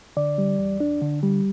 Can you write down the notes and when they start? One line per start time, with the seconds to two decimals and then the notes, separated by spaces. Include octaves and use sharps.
0.17 D3 D5
0.38 G3
0.59 E2
0.80 D4
1.02 D3
1.23 G3